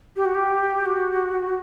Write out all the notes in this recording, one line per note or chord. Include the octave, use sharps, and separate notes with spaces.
G4
F#4
G4
F#4